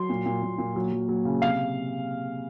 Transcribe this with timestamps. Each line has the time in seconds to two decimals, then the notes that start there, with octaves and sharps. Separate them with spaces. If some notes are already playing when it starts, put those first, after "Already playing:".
Already playing: F#3 C6
0.09 A#2
0.26 A#2
0.42 A#2
0.58 A#2
0.76 F#3
0.92 F#3
1.09 F#3
1.25 C#3
1.42 C3 F5